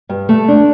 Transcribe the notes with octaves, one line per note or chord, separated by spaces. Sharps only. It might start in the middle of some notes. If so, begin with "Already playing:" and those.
G2
A3
D4